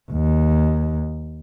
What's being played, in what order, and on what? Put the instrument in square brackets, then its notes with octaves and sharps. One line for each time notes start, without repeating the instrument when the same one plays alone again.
[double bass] D#2